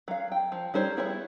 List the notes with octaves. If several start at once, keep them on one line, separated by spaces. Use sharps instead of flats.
F#3 F5
G5
F3
G3 D#4 C5 C#5
B3 E4 G#4 C#5